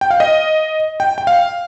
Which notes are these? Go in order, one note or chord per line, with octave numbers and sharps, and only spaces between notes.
G5
F5
D#5
G5
G5
F5